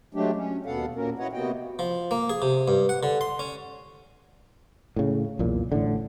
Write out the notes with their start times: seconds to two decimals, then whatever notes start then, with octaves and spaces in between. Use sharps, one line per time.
0.14 F#3 G#3 A3 D4 G4
0.36 C#4
0.66 D#2 B2 B3 A4 F5 F#5
0.96 A#2 A#3 C#4 F#4 A#4
1.19 E4 F#4 B4 C#5 D#5 F#5
1.33 C3 A#3 B3 F#4 D#5 G5
1.79 F3
2.11 A#3
2.30 G#4
2.42 C3
2.68 G2
2.89 F#5
3.03 D3
3.21 C6
3.39 C#4
4.96 A2 C#3
5.39 B1 E2 A#2
5.72 A1 A2 D3